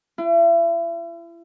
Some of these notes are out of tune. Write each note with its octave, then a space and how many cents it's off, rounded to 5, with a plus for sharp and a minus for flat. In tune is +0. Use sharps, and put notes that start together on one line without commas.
E4 +40